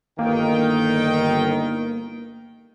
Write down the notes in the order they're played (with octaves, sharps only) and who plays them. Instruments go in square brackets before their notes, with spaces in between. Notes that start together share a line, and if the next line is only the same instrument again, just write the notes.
[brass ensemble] G1 D#3 G5 [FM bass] A#3